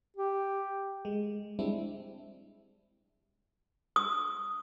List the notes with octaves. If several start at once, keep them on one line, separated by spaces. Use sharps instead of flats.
G4
G#3
G3 G#3 C4 D4 E4
D#6